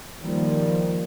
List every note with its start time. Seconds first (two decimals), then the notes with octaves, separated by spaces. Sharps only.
0.21 D#3 F3 G3 A#3